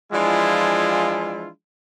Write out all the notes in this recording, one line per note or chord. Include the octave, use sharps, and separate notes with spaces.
E3 F3 G#3 D4 E4 F4